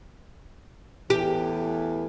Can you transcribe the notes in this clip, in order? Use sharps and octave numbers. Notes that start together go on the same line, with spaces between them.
E2 A2 E3 G4